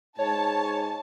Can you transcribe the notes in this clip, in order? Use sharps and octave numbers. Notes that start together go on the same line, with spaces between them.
G#2 C#5 A5